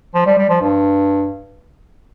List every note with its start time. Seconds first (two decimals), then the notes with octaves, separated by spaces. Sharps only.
0.14 F3
0.26 G3
0.38 G3
0.49 F3
0.61 G2